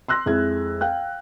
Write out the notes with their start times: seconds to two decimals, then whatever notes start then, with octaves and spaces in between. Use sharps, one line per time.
0.08 C6 E6 F#6 A#6
0.26 F2 G#3 E4 G#6
0.81 F5 G5 F#6